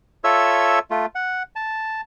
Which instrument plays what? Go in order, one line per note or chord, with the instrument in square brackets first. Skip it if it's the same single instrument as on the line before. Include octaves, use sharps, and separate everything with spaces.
[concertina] F4 A4 C#5 E5 E6
A3 F4
F#5
A5